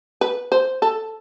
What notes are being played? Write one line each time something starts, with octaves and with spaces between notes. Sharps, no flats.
B4
C5
A4